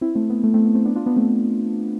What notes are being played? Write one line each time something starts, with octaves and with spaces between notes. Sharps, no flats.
C4 E4
A3 C4
B3
A3
A3 C4
B3
A3 C4
B3 D4
D4 F4
B3 D4
A3 C4